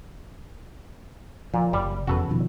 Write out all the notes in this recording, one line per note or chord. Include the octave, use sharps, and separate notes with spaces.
A#2 F3
F#1 G3
F1 E2 C#3 F#4 A4 B4
B2 D#3 F3